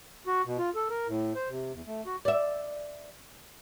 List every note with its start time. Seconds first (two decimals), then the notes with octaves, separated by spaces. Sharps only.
0.27 F#4
0.45 B2
0.58 F4
0.75 A4
0.90 A#4
1.07 A2
1.35 C5
1.49 C3
1.72 E2
1.87 A3
2.06 F#4
2.25 D5 E5